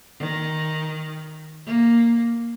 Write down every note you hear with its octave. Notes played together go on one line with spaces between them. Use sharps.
D#3
A#3